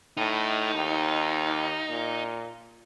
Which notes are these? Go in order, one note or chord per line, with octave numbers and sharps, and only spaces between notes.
A2 D#4
D#2
A#2